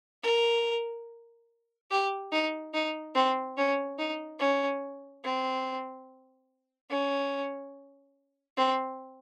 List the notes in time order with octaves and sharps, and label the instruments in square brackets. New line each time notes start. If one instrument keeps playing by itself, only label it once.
[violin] A#4
G4
D#4
D#4
C4
C#4
D#4
C#4
C4
C#4
C4